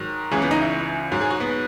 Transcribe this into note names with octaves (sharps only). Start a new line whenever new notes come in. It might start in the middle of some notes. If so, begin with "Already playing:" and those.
Already playing: G#2 D#3 F#3
C#2 C#3 E3 G#3
B3
D#4
E4
G#2 F#3
G#4
F#4
B3